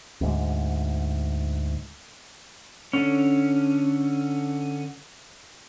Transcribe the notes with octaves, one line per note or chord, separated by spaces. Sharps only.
D2 G#2
D3 C#4